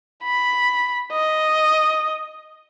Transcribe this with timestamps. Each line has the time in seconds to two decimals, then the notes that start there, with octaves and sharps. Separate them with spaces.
0.24 B5
1.12 D#5